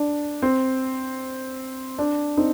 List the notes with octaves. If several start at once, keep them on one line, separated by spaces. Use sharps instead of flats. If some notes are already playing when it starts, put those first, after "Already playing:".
Already playing: D4
C4
D4
C4 D#4